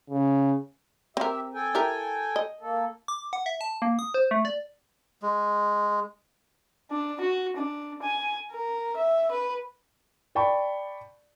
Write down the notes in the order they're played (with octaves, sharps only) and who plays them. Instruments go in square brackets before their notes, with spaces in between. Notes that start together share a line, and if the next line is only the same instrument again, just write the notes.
[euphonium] C#3
[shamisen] C4 A#4 [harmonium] G4 E5
[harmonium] A4 G5 G#5
[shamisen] E4 G4 A#4
D#5
[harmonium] A#3 A4
[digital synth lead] D6
F#5
E5
A5
A#3
D#6
C5
A3
D5
[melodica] G#3
[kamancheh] D4
F#4
D4
G#5
A#4
E5
B4
[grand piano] D5 G5 A5 B5 C#6